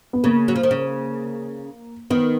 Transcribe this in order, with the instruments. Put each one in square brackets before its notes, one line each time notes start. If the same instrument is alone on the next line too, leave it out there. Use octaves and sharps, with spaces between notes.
[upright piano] B3
[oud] C#3 [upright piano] A#3
[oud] F#3
F3
D#3
C#3
[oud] D#3 [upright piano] B3